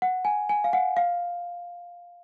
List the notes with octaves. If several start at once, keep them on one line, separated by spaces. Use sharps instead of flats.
F#5
G#5
G#5
F5
F#5
F5